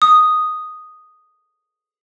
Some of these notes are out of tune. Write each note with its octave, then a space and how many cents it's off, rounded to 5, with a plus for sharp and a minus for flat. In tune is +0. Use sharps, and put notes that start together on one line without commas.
D#6 +0